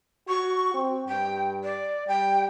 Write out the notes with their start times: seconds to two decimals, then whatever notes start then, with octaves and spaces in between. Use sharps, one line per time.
0.28 F#4 C#6
0.74 C4
1.08 G2 G5
1.64 D5
2.08 G3 G5